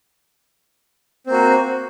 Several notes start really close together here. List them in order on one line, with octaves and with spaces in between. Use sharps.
C4 A#3 F#4